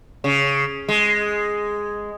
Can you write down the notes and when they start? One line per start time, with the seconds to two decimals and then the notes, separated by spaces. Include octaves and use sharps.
0.24 C#3
0.88 G#3